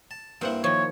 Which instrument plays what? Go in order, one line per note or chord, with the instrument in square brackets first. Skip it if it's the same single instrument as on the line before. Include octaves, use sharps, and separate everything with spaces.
[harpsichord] A5
[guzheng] G2 C5 F#5 [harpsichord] A#3 C4 E4
[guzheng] D#3 F3 [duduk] C#5